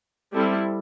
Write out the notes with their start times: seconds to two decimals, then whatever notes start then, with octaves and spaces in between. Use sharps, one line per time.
0.34 G3 C4 E4 A4